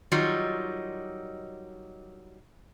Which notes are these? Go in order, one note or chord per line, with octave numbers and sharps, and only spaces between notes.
D#3 F#3 G3 D#4 F4